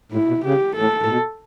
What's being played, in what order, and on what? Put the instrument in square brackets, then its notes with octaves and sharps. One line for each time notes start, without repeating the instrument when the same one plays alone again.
[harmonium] A2 [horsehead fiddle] E4
[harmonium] B2
[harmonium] C#3 [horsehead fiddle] G4
[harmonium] A2 [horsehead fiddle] A4
[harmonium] A2
B2